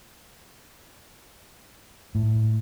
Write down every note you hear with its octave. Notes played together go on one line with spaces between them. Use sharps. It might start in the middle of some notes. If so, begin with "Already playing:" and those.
A2